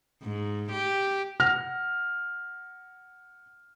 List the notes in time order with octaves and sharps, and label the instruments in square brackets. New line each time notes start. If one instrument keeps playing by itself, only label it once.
[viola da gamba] G#2
G4
[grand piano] F#5 F6 A#6